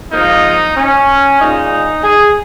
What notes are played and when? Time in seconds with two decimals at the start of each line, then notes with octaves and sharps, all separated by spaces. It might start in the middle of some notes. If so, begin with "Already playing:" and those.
0.10 G#2 F3 A#3 D#4
0.75 C#4
1.39 A#2 G#3 D#4
2.03 G#4